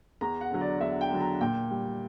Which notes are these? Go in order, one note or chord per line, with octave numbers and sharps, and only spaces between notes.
E2 A#5
F#5
D3 F#3
D5
E2 E5
G5
D3 F#3
A#5
A#2 G5
G3